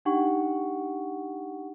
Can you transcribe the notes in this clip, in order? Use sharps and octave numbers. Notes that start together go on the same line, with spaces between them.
D4 D#4 G4 F#5 G5 C#6